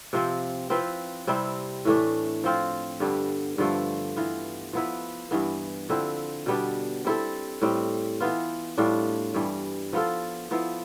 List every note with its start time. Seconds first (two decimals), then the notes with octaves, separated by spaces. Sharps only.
0.13 C3 F3 C4
0.70 F3 C4 E4 B4
1.27 C3 G3 C4 E4
1.85 A2 E3 A3 D4
2.44 F3 C4 F4
3.00 G2 D3 G3 B3
3.58 G2 D3 F3 A3
4.17 E3 B3 F4
4.73 F3 B3 E4 B4
5.31 G2 E3 B3
5.89 D3 F3 C4 E4
6.46 B2 G3 B3 D4
7.05 G3 C4 E4 A4
7.62 A2 G3 C4
8.20 E3 B3 F4
8.78 A2 G3 D4 F4
9.34 G2 E3 G3
9.93 F3 B3 F4 A4
10.51 F3 B3 E4